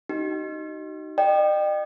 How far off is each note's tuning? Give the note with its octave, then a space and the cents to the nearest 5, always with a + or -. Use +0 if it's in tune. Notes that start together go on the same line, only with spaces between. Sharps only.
D#4 +0 F#4 +45
D#5 -45 G5 +0